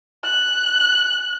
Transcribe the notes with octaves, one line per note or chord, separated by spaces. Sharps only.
F#6